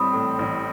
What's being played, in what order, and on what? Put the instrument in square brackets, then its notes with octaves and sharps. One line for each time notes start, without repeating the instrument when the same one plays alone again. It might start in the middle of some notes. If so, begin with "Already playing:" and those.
Already playing: [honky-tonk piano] A1 A2 G3 C4 [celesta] B5 D#6
[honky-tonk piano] A2
A1